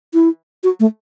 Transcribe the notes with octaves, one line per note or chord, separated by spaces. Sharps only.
E4
F#4
A3